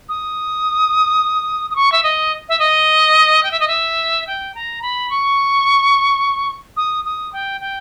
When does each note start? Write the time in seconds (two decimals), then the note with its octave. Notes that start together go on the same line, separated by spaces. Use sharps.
0.09 D#6
1.70 D#6
1.76 C#6
1.92 E5
2.03 D#5
2.49 E5
2.59 D#5
3.43 G5
3.51 E5
3.60 D#5
3.68 E5
4.27 G5
4.55 A#5
4.82 B5
5.10 C#6
6.77 D#6
7.05 D#6
7.33 G5
7.61 G5